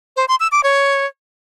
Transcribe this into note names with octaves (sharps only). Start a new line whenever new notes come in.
C5
C6
E6
D6
C#5